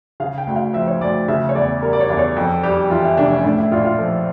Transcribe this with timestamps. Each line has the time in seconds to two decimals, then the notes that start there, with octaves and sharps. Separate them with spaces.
0.20 C#3 F5
0.38 G5
0.47 D2
0.56 F5
0.73 F3 E5
0.87 C#5
1.01 D2 D5
1.28 C#3 E5
1.49 C#5
1.55 E2 D5
1.82 G3 A#4
1.93 D5
2.00 C#5
2.10 E2 D5
2.19 C#5
2.36 F2 A4
2.63 G3 G4
2.90 E3 F4
3.04 E4
3.17 F1 D4
3.31 C#4
3.44 A2 D4
3.58 E4
3.72 A#1 F4
3.85 F4
3.99 F3 A4